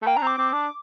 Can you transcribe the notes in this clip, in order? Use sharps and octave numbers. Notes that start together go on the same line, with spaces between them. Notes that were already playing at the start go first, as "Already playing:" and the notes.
A3
A#3 G5
D4 A#5
C4 D6
C4
D4